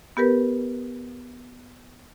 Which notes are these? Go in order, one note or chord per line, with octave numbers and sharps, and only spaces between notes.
B3 G4 A#4 B4